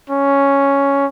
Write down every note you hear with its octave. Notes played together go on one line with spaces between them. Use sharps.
C#4